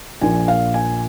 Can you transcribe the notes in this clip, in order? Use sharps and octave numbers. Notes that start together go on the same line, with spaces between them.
A#1 A#2 F3 G#5
F5
G#5